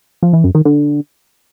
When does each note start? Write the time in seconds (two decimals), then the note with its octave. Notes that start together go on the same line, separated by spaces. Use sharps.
0.23 F3
0.33 E3
0.44 F#2
0.55 D#3
0.65 D3